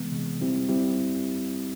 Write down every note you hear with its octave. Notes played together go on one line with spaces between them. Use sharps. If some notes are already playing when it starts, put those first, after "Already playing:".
Already playing: C3 E3 G#3 B3
C3 E3 G#3 B3
G3 C4 E4 G4
G3 C4 E4 G4